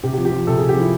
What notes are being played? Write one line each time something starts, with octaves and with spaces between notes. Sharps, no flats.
C3 G4
G4
F3
G4
F3
C3 A4
C3 G#4
G4
F3 E4